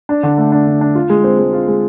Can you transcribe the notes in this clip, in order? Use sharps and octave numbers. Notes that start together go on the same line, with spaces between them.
D4
D3
A3
D4
D3
D4
F4
G#3
C4
G#3
F4
G#3